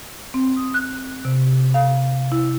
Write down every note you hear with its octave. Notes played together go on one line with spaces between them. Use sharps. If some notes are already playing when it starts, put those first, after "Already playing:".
C4
D#6
F#6
C3
F5
E4